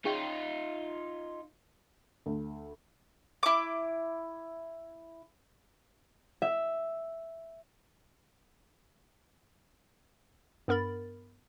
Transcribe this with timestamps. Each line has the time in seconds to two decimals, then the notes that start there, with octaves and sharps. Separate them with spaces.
0.05 D#4 F4 G#4 C#5 G5
2.26 D2
3.43 E4 D6
6.42 E5
10.68 G2 B3 A#4 B5 A6